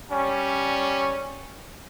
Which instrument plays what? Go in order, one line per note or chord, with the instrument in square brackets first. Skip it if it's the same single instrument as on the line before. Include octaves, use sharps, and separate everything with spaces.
[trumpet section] G3 C#4